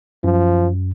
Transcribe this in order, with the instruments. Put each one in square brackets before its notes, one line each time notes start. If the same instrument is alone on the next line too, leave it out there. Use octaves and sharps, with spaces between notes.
[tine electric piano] F#2 [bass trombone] F3